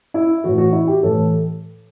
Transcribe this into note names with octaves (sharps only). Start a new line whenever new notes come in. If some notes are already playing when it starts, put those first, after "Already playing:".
E4
A2 E3 F#4
F#4
E4
G4
A2 E3 A4